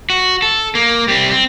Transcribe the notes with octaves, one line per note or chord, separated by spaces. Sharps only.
F#4
A4
A#3
G3 C4
C4